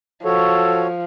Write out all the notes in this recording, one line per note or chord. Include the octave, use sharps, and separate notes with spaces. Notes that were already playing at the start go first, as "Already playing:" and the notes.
F3 F#4 A4 C#5